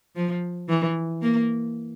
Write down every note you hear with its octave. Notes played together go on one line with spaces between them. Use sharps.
F3
E3
A#3